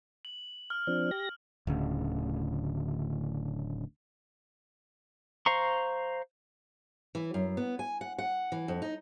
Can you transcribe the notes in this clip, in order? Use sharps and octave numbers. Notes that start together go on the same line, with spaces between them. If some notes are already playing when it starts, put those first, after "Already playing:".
F#7
F6
F3 C4 D4
G4 A#6
D1 D2 C#3
C5 F5 A#5 C6 C#6
E3
F#2
B3
G#5
F#5
F#5
E3
F2
D#4